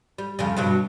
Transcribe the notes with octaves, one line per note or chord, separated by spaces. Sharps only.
G3
F2 C#3 G3
G2 B2 F#3